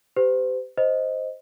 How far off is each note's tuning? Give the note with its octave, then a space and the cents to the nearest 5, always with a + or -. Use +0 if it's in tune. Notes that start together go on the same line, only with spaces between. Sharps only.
G4 +0 C5 -40
C5 +0 D#5 +0